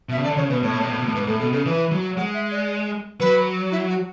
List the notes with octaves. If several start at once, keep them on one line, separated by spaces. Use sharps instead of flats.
B2 E5
C#3
D3 D5
C#3 C#5
B2 B4
A2 C#5
B2
A2
B2
A2
B2
A2
G#2 B4
A2 A4
B2 A4
C#3 A4
E3 B4
F#3
G#3 F#5
E5
D5
F#3 B4
E4
F#4